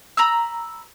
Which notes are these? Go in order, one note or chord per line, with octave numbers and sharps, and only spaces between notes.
A#5 B5 E6